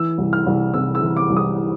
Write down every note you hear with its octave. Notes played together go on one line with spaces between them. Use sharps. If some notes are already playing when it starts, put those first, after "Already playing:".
Already playing: E3 E6
C2
F6
C2
C3 E6
E6
E3
D6
C2
D#6